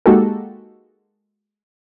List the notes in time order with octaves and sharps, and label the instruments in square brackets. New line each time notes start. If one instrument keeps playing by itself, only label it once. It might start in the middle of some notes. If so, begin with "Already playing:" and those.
[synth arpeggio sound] G#3 A#3 D#4 F#4 G4 A4